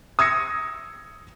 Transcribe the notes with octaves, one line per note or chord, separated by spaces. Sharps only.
D#6 E6 G#6 A#6 C#7